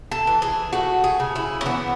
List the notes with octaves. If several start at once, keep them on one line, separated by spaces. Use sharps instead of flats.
A4
E3
G#4
A3 F#4
G#4
C#3
E4
C#4
E3 B3